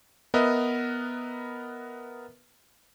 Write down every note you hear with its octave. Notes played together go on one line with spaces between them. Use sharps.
B3 A#4 B4 D#5 E5